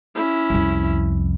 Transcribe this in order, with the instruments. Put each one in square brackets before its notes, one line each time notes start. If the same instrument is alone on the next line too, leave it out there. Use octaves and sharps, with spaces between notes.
[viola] C#4 E4
[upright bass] C2 F2